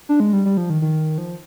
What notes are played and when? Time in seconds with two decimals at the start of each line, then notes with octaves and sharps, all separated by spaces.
0.09 D4
0.20 G#3
0.33 G3
0.46 G3
0.57 F3
0.70 D#3
0.82 D#3
1.18 F3